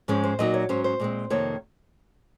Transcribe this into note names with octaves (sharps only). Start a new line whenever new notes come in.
G#2 F3 G#3 C#4
C5
A#2 F#3 A#3 D#4 D#5
C#5
G#2 F#3 C#4 C5
C5
A#2 G#3 C4
F2 C3 D#3 A#3 C#5